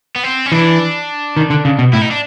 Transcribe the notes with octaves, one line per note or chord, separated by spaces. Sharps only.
B3
C4
C#4
E3 D4
D#3
D3
C#3
B2
A2 E4
D#4
D4